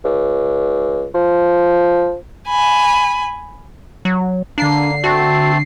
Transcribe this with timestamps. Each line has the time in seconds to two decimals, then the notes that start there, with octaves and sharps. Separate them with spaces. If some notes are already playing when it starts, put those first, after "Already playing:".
0.05 C#2
1.15 F3
2.48 G#5 B5
4.05 F#3
4.58 D3 A#3 D4 C7
5.04 A3 C4 F#4 A5